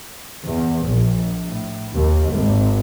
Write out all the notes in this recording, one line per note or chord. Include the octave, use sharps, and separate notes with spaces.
E2
A#1
A2
D#2
G#1